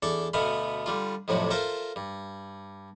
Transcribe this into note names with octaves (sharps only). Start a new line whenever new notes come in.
E2 D4 A4 D5 C#6
D2 B2 A3 B3 F5
D3 G3 F4
F2 A2 C3 F#3 D4
F4 A4 A#4 C5 E5 F5
G2